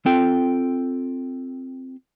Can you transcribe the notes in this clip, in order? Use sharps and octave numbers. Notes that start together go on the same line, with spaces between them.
C4 F4 A4 G5